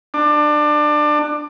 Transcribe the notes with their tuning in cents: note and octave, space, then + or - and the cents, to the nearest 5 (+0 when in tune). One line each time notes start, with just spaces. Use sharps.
D4 +25